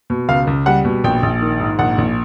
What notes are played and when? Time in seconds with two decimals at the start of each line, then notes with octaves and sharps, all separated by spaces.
0.10 B2
0.28 C#2 F5
0.47 C#2
0.66 G3 F#5
0.85 B2
1.04 A#1 G5
1.23 A#1
1.41 D#3
1.60 G#2
1.79 A#1 F#5
1.98 A#1